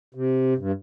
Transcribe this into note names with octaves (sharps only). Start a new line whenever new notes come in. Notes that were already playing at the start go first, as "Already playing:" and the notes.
C3
G2